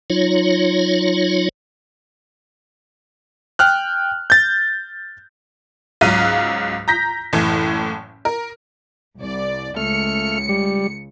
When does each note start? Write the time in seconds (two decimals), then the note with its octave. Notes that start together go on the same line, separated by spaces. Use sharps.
0.10 F#3 D#4 F4 C#5
3.59 G5 F6 F#6
4.30 G6 A6
6.01 C#2 G#2 F#3 F5 F#6 D#7
6.88 A#5 G6 A#6 B6
7.33 F#1 A2 E3
8.25 A#4
9.18 C2 D5
9.77 C#2 A3 F6 C#7
10.49 G3